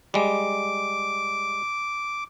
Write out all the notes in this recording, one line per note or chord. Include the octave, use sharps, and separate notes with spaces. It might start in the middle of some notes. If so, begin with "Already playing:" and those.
G3 G#3 D6